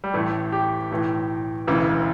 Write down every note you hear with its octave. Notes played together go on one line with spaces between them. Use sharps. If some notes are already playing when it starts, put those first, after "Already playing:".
G3
A1 A2 E3 A3
G4
B1 A2 E3
E1 D2 C#3 E3